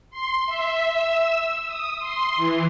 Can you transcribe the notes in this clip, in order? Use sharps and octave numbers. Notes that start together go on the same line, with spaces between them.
C6
E5
E6
D#6
C6
E3